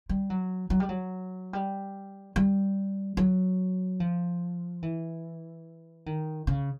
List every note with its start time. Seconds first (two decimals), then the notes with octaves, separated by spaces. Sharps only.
0.09 G3
0.30 F#3
0.70 F#3
0.80 G3
0.89 F#3
1.53 G3
2.36 G3
3.17 F#3
4.00 F3
4.83 E3
6.06 D#3
6.47 C#3